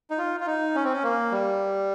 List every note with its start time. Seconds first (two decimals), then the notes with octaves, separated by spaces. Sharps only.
0.10 D#4
0.18 F4
0.40 F4
0.46 D#4
0.75 C#4
0.84 C4
0.92 C#4
1.03 A#3
1.31 G3